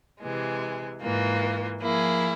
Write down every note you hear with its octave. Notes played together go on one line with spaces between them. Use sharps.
C3 E3 G#3
G#2 E3 A#3 F4
F3 A#3 E4 G#4